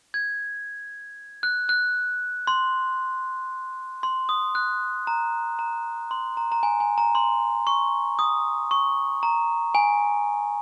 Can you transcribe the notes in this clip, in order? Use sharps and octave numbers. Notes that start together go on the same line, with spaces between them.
G#6
F#6
F#6
C6
C6
D#6
F#6
A#5
A#5
C6
A#5
A#5
G#5
G#5
A#5
C6
C#6
D#6
C#6
A#5
G#5